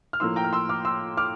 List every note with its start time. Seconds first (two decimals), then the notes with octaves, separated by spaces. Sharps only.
0.13 F6
0.20 A2 F3 A#3 C6 E6
0.36 G5 A#5
0.44 F6
0.53 C6 E6
0.69 D6 F6
0.85 C6 E6
1.17 D6 F6